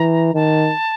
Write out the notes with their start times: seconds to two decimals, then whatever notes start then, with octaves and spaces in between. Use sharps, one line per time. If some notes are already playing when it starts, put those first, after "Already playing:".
Already playing: E3 A#5
0.34 D#3 A5